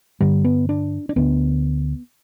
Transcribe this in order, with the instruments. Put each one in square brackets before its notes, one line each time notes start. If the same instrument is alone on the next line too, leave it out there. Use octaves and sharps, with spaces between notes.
[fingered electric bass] G2 D3 G3
B3
D4
D4
D2 D3 B3